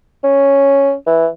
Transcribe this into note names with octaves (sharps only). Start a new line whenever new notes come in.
C#4
E3